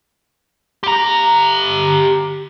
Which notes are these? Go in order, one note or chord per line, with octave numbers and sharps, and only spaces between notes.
G4 A#5